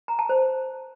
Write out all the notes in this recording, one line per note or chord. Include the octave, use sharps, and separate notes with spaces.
A#5
A5
C5